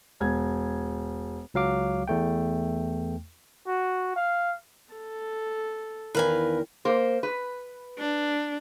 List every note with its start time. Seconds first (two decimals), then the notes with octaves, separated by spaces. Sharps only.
0.20 E1 G#6
1.54 C#2 F#3 F5 D6
2.08 E2 A3 G5
3.67 F#4
4.16 F5
4.93 A4
6.15 E2 D#3 A#4 B4 F5 G#5
6.85 A#3 C5
7.23 B4
7.99 D4